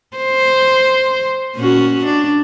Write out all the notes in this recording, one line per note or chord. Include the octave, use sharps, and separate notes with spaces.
C5
A#2 C#4 F#4
D4